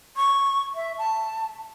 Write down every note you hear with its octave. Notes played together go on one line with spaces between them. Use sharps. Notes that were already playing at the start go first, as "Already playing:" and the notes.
C#6
E5
A5